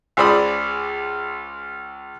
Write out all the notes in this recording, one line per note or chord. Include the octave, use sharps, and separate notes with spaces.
C#2 G#4 C5 D5 B5 D#6